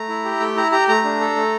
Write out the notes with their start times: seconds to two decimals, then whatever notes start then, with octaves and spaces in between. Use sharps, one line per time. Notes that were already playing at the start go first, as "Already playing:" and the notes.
Already playing: A3 A#5
0.09 E4
0.25 G4
0.40 A3 G5
0.56 E4 A#5
0.72 G4 A#5
0.88 A3 A#5
1.04 D4
1.20 A4
1.36 A3